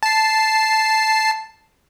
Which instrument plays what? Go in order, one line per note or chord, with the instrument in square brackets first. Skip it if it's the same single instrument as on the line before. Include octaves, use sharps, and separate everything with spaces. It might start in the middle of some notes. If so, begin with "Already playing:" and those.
[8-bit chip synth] A5 C7